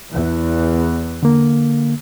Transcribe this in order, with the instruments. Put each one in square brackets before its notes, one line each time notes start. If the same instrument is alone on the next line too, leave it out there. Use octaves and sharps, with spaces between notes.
[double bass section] E2
[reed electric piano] D3 A#3